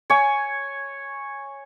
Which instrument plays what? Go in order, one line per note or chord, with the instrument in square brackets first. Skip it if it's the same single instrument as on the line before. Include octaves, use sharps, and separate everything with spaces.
[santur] C#5 G#5